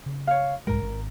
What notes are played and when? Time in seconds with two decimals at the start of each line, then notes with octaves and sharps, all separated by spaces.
0.06 C#3
0.27 C#5 F5
0.67 C2 G#2 G#3 A#4
0.82 G#1